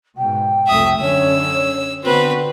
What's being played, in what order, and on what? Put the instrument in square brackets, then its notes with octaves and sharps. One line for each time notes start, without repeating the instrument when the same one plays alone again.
[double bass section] G#2 B2 [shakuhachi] G5
[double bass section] C2 F2 A3 [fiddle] E5 D#6
[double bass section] F#2 D3 C#4 [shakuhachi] C#5 [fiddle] E6
[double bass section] D3 B3 [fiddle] C4 B4 [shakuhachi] F#4